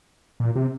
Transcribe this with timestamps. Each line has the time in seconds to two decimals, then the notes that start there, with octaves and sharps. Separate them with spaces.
0.40 A#2
0.56 C3